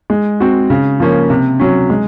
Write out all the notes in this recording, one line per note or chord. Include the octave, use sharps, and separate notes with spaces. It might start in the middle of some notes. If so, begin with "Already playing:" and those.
G#3
C4 F#4
C#3
F3 A#3 C#4
C3
F#3 C#4
G#3